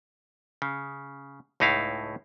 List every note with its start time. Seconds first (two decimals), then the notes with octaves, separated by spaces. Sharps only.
0.62 C#3
1.60 C#2 A2 D#4 E4 F5